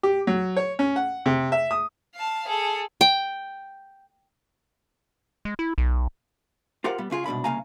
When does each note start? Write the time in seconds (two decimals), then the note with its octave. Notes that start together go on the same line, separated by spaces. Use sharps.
0.03 G4
0.27 F#3
0.57 C#5
0.79 C#4
0.96 F#5
1.26 C3
1.52 E5
1.71 D#6
2.14 F5 A5
2.47 G#4 A4
3.01 G5
5.45 G#3
5.59 E4
5.78 B1
6.84 F4 G4 A#4 C5 F5 F#5
6.98 G3 B3
7.10 C#2 C#3 F4 G#4
7.26 C2 G#2 B2 D4 B5
7.44 C2 C#3 A#3 F5 G#5 A#5